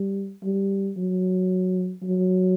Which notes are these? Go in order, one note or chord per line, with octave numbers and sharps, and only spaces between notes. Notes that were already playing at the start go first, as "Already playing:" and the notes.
Already playing: G3
G3
F#3
F#3